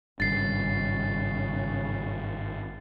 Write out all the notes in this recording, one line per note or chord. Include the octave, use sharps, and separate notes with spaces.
G#1 G2 C#3 A6 C7